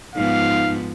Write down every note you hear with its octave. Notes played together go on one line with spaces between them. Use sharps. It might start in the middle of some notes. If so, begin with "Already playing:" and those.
G#2 F3 B3 D#4 F5